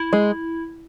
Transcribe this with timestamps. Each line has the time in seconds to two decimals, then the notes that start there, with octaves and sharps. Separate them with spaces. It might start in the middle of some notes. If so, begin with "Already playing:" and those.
Already playing: E4
0.13 G#3